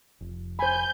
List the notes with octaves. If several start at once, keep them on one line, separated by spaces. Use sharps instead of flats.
F1
C5 G#5 B5 G6